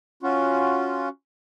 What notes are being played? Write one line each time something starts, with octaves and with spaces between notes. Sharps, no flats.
C#4 F4 F#4